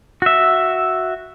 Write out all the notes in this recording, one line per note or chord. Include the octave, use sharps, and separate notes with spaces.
F#4 E5